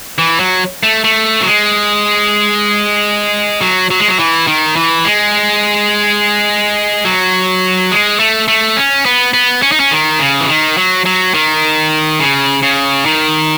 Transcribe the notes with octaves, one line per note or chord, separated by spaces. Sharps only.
E3
F#3
A3
A3
F#3
G#3
F#3
F#3
G#3
F#3
E3
D#3
E3
G#3
F#3
G#3
A3
A3
C#4
B3
B3
C#4
D#4
C#4
D#3
C#3
E3
D#3
F#3
F#3
D#3
C#3
C#3
D#3